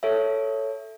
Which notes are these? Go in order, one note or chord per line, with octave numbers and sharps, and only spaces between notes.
A4 C#5 E5